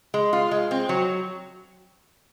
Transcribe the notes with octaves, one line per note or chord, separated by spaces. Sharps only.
G#3
F4
G#3
C4
F#3